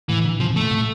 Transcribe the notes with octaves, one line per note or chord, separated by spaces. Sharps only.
A2 E3
D3
C3 F3
C3
A#2 A3
A2